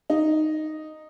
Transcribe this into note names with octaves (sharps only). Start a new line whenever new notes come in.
D#4